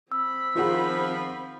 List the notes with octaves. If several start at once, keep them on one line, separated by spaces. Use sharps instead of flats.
C4 B5 E6
D#3 F3 F4 G#4 F#5